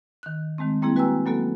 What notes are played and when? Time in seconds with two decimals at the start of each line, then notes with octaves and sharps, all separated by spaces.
0.23 D#3 F#6
0.58 D#3 G#3 A3 C4
0.82 G3 A#3 C4 E4 G#4
0.96 F#4 B4 G5 G#5 A#5 E6
1.26 F#3 A#3 B3 F#4 A4